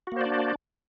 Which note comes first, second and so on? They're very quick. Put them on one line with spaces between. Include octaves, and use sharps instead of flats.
F#4 A#3 C5 D5 D4